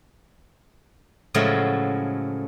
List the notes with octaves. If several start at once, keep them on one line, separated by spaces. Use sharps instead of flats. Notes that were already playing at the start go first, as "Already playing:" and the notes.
A2 C#3 F3 F#3 G#3 A3